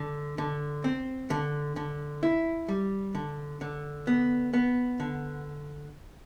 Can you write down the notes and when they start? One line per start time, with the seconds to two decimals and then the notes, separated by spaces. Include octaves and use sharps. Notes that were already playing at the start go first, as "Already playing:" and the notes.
Already playing: D3
0.38 D3
0.84 C4
1.30 D3
1.76 D3
2.23 E4
2.69 G3
3.15 D3
3.61 D3
4.07 B3
4.54 B3
5.00 D3